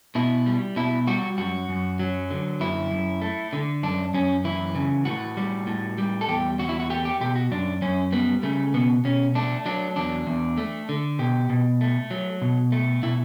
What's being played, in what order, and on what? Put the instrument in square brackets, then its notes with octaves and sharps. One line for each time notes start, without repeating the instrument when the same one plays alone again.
[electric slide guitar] B2 E4
G3
B2 E4
G3 F#4
F#2 F#4
F#2
F#3
D3
F#2 E4
F#2
A3
D3
F#2 D4
F#2 C#4
E3 E4
C#3
A2 F#4
G3
A2
G3
A4
E2 G4
E2 F#4
E4
F#4
A3 G4
G4
B2 G4
F#4
F#2 D4
F#2 C#4
G3 B3
C#3 A3
B2 B3
B2 C#4
A3 D4
F#3 D4
E2 D4
E2
A3
D3
B2 G4
B2
A3
F#3
B2
A3
B2 E4